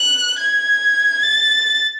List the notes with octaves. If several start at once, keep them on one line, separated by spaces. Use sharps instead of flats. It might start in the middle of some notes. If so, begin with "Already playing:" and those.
Already playing: F#6
G#6
A6